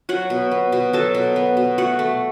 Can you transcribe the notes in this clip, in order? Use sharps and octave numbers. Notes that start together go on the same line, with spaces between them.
F#3 F#4 F#5
B2
B3
B2
F#3 A4 A5
B2
B3
B2
A3 F#4 F#5
A3